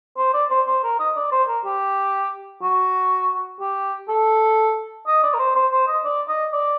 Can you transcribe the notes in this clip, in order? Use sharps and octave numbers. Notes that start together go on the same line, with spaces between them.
C5
D5
C5
C5
A#4
D#5
D5
C5
A#4
G4
F#4
G4
A4
D#5
D5
A#4
C5
C5
C5
D#5
D5
D#5
D5